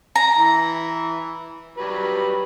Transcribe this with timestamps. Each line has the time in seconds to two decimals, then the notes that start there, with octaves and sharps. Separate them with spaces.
0.16 A#5
0.36 E3
1.78 F#3 G3 B4